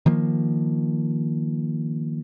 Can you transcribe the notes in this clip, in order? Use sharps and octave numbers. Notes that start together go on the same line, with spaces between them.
D#3 F3 A#3